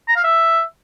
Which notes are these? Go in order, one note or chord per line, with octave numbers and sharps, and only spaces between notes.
A#5
F5
E5